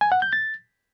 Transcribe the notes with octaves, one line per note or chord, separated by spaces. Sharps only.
G#5
F#5
G6
A6